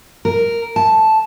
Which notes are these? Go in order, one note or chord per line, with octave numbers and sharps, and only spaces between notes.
A#4
A5